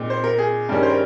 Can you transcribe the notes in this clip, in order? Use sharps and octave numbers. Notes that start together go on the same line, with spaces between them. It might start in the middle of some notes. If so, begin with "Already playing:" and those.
Already playing: A#2 G#3 C4 D#4
C5
A#4
G#4
G2 D#3 G3 C#4
C5
A#4